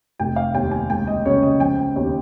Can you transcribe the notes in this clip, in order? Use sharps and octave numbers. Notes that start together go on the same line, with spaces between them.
F1 G5
F5
D#2 G5
G#5
C#2 G5
D#5
C#3 C#5
D#5
F3 G5
D#2